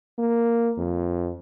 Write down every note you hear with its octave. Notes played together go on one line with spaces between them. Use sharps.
A#3
F2